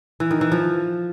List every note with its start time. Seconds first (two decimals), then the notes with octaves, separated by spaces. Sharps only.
0.20 E3
0.31 D#3
0.41 E3
0.52 F3